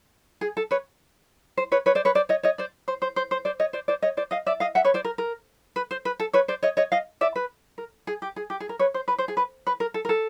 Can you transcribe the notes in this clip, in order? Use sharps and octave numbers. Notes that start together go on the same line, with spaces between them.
G#4
A4
B4 C#5
C5
B4 C#5
B4 C#5
C5 D5
B4 C#5
C5 D5
C#5 D#5
C#5 D#5
C5 D5
C5
C5
C5
C5
C5 D5
C#5 D#5
C5 D5
C5 D5
C#5 D#5
C5 D5
D#5 F5
D5 E5
D#5 F5
E5 F#5
B4 C#5
C5 D5
A#4
A#4
B4
C5
B4
A4
B4 C#5
C5 D5
C#5 D#5
C#5 D#5
D#5 F5
D5 E5
B4
A#4
G#4
G4
G#4
G4
G#4
A#4
B4 C#5
C5
B4
C5
G#4
B4
B4
A#4
A4
A#4
A4